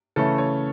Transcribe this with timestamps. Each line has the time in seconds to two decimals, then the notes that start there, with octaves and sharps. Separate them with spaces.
0.16 C#3 E3 A3 C#4 A4
0.38 C#5